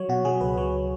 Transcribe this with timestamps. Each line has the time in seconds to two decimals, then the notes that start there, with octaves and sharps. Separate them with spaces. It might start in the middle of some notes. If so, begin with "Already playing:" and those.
Already playing: F#3 C#5
0.09 B2 F#4
0.25 F#3 G#4
0.41 C#2 B4
0.57 F#3 C#5